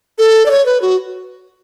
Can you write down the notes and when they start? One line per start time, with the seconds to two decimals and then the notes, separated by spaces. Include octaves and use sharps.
0.19 A4
0.46 D5
0.51 C#5
0.66 B4
0.82 F#4